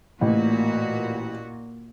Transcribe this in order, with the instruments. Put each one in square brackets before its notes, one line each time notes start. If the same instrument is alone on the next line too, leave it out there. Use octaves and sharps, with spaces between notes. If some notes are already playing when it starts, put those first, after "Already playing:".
[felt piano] A1 [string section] A#2 F#4